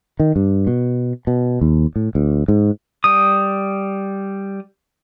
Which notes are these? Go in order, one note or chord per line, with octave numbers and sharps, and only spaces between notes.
D#3
G2
B2
B2
D#2
A2
D2
G#2
G3 D#6